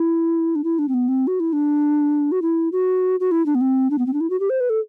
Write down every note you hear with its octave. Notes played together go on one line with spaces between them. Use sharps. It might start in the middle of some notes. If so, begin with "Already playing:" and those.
Already playing: E4
D4
E4
D4
C4
B3
C4
F#4
E4
D4
F#4
E4
F#4
F#4
E4
D4
B3
C4
D4
B3
C4
D4
E4
F#4
G4
C5
B4
A4